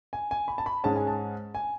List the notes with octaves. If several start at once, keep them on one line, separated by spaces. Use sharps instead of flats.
G#5
G#5
B5
A5
B5
G#2 G#3 C#4 A5
G#5
A5
G#5